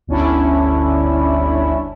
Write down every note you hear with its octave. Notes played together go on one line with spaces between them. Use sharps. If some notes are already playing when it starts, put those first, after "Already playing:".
G1 D2 C#4 D4 E4